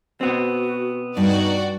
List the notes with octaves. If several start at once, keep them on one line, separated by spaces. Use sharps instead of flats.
B2 B3 C4 F#4
G2 D#4 F#4 D5